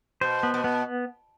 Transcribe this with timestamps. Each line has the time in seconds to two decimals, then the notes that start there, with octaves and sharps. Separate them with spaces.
0.21 B2 C5
0.43 B3
0.54 B2
0.64 B3